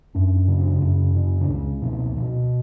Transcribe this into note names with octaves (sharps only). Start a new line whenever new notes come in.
F#2 D4
C#4
C#3
D4
D4
F#2 C#4
C#3
D4
C#2 C#4
B2
B2